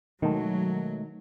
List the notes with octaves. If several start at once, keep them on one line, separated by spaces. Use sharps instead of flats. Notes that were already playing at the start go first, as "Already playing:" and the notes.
B2 D#3 F#3 G#3 A3